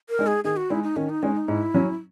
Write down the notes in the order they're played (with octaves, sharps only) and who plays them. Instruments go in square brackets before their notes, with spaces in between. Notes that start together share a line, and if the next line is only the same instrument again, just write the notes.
[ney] A#4
[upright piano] G#3 D#4
[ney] G#4
[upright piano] D#3 [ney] G#4
[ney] F#4
[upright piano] G#3 D#4 [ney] E4
[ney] D#4
[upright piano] D#3 [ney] C#4
[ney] D#4
[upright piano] G#3 D#4 [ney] C#4
[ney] D#4
[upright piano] G#2 [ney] E4
[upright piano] F#3 C#4